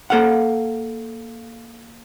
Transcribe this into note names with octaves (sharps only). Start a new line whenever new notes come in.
A#3 A4 F5 F#5